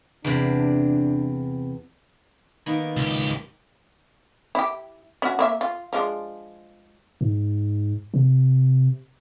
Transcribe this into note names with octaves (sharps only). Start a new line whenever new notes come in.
E2 C3 D4
D#3 A#3 B3
C#2 G4
E4 G4
C#4 F#4
A#3 C5 E5
F4
F3 G#3 D4
G#2
C3